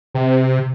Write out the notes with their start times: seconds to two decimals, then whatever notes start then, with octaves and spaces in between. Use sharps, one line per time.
0.15 C3